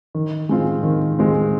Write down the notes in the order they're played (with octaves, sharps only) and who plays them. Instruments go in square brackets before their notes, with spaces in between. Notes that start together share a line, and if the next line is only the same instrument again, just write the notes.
[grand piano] D#3
G#3 C4 F4
D#3
G#3 C4 F4